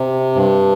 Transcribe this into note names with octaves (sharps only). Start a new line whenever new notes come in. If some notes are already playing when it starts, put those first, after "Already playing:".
Already playing: C3
G2